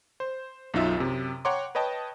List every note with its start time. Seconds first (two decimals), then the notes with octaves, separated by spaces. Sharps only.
0.20 C5
0.74 B1 F#2 D#4 F4 E5 E6
0.97 F#2 C3
1.45 C#5 F#5 G5 A#5 C6 D6
1.75 B4 C#5 D#5 G5 A5